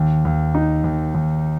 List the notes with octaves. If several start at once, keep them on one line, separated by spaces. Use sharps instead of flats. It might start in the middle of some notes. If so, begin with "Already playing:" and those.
Already playing: D#2
D#2
D#4
D#2
D#2